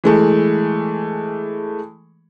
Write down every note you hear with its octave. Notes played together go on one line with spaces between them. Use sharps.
E3 G#3 A3